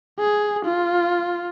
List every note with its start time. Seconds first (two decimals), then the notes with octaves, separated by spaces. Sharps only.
0.19 G#4
0.65 F4